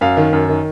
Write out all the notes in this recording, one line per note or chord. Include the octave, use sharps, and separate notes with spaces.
F#2 F5
D#3
F#2
D#3